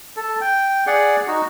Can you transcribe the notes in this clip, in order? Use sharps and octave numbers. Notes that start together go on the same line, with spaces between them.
A4
G5
G#4 D5 F#5
D#4 F#4